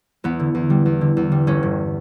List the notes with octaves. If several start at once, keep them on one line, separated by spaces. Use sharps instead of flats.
E2 B3
D3
E2
G3
E2
D3
E2
G3
G1 C#4
G2